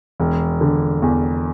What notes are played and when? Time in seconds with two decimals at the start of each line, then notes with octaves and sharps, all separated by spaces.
0.20 E1
0.61 D3
1.02 E2